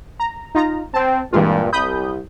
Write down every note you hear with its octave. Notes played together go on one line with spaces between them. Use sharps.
A#5
D#4 F4 A#5
C4 A5
G2 A#2 E3 G#3 F4
C2 B5 D#6 G6